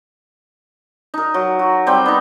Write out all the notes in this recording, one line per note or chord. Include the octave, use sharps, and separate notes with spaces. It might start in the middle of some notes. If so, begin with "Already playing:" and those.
D#4 A#4
F#3
F#4
G3 C4 G5
B3 D#4